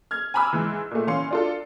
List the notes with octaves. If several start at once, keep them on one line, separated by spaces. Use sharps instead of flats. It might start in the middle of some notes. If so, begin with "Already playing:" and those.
F6 G#6
G#5 A#5 B5 D6 E6 F6
G#2 E3
A#2 A3
E3 C#4 F5 C6 C#7
D4 F4 A4